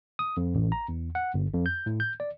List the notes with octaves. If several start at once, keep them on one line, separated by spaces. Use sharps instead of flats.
D#6
F2
A1
A#5
E2
F#5
G1
F2
G6
A2
G6
D5